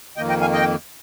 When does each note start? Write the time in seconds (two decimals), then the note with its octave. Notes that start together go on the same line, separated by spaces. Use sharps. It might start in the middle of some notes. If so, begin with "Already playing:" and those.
0.17 F2 D#3 A#3 D#5 G5
0.29 D#5 G5
0.41 F5 G#5
0.53 D#5 G5